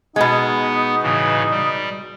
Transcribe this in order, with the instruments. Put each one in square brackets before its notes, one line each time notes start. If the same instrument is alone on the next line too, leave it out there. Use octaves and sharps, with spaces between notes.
[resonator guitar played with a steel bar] B2 G#3 [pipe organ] B3 [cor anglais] D#4
[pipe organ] A2 C#3 E3
G3